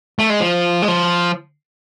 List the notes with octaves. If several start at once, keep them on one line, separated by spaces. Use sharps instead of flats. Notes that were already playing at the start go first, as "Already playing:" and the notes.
A3
G#3
F3
G#3
F3